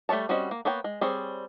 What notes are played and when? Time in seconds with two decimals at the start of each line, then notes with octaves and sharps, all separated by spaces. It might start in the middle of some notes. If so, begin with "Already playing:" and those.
0.09 G3 A3 A#3 C#5 A5
0.29 G3 C4 C#4 F#4 D#5
0.51 A#3
0.65 A#3 B3 C#5 G5
0.84 G#3
1.01 G3 C4 G#4 C#5